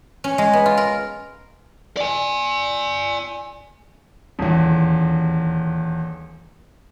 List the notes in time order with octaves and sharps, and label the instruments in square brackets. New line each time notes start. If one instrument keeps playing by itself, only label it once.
[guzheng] C#4
G#3
B3
F4
A#4
[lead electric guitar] D5 G#5
[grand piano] D#1 E2